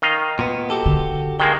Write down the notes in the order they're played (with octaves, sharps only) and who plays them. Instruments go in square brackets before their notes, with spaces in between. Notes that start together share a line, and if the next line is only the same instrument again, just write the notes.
[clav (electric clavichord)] D#3 D#5 F5
[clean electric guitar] A#2 B3
F#4 G4 A4
[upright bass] D3
[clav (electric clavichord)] D#3 G#3 A#3 [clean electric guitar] G5